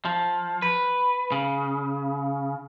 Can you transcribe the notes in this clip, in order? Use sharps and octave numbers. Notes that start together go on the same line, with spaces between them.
F3
B4
C#3